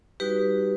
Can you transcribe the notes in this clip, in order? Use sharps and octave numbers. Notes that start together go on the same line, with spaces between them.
G3 D#4 F#4 G4 B4